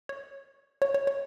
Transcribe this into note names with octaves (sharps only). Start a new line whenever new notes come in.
C#5
C#5
C#5
C#5